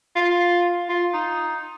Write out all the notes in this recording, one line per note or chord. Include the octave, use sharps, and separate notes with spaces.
F4
F4
D#4